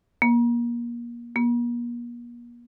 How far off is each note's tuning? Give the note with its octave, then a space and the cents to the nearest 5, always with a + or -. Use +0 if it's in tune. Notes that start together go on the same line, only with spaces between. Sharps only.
A#3 +30
A#3 +45